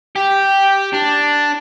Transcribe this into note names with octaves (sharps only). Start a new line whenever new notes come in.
G4
D4